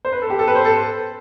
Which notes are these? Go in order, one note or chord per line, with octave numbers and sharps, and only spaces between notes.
C5
B4
A4
G4
A4
B4
C5
A4